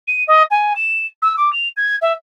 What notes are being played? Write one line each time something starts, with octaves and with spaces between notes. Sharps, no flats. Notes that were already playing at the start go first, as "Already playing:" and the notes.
D#7
D#5
G#5
E7
E6
D6
F7
G#6
E5